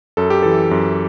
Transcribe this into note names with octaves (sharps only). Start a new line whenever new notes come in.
F#2 A4
G4
E3 A4
F#2